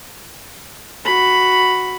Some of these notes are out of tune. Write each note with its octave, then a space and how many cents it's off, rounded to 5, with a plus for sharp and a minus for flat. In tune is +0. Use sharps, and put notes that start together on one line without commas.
F#4 +0 B5 +5